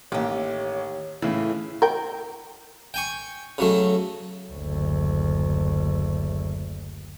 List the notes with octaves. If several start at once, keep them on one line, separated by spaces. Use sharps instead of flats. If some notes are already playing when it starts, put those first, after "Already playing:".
A1 D#2 G4 C#5
A2 C#3 E3
A#4 G5
G5 G#5 C#6
C#3 F#3 A3
F#1 D2